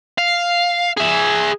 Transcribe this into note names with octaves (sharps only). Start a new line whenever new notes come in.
F5
G#4 E5